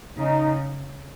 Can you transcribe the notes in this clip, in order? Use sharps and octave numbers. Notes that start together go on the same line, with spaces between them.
C#3 D#4